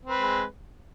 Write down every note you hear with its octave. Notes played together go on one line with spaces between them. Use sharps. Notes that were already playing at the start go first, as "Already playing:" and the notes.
G#3 C4 B4